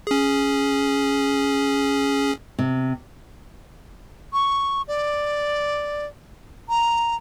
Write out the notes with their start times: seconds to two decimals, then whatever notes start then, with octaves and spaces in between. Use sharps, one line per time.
0.07 C#4 G#4
2.59 C3
4.33 C#6
4.88 D5
6.69 A#5